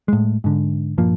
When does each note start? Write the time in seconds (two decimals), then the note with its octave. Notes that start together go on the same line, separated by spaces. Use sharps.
0.08 A2 G#3
0.44 G#2 D3
0.98 A#1 G2 F3 A#3